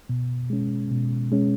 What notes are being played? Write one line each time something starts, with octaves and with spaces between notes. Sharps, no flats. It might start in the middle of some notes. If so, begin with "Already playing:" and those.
B2
G#3 C#4
B2
G#3 C#4